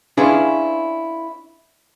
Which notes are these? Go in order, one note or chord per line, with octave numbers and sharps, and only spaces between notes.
C#4 D4 E4 F4 G#4 B4